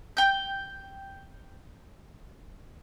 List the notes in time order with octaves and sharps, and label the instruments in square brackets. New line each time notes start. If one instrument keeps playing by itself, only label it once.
[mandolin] G5 G6